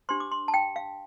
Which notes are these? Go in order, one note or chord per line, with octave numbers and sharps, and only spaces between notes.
D4 G4 C5 C6
D6
C6
A5
G5
F5